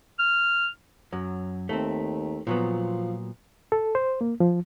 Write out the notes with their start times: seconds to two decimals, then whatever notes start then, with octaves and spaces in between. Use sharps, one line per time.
0.19 F6
1.12 F#2 F#3
1.69 D#2 A3 C4
2.47 A#2 F3 F#3 B3
3.72 A4
3.95 C5
4.21 A#3
4.40 F3